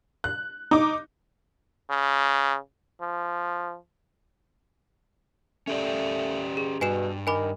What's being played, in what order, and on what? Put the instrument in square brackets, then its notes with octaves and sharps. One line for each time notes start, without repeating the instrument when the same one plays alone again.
[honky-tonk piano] F#6
D#4 D6
[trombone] C#3
F3
[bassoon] A3 [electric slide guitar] C#4 G4 D5
[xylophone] G#4
[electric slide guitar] G2 [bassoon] B2 [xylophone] G#5 C7 E7
[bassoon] D#3 [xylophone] G#5 B5 D6